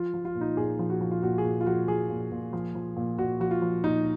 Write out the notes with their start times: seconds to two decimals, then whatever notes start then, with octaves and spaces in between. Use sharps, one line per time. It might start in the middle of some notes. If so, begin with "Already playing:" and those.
Already playing: F3 F4
0.14 F3
0.25 F4
0.35 A#2
0.41 D#4
0.57 A#2 G#4
0.79 F3
0.90 F#4
1.01 F3
1.11 F4
1.23 A#2 F#4
1.38 G#4
1.44 A#2 F#4
1.61 F4
1.66 F3 F#4
1.88 F3 G#4
2.10 A#2
2.32 A#2
2.53 F3
2.75 F3
2.97 A#2
3.18 A#2 F#4
3.40 F3 F#4
3.51 F4
3.62 F3
3.84 A#2 D#4